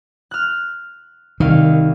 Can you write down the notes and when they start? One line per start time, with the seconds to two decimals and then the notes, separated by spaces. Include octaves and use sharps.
0.31 F6 F#6
1.40 C2 D#3 F5